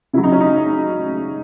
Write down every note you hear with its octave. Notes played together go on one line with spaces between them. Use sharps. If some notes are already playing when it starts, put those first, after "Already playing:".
C#3 F#3 E4
D#4
C#4
D#4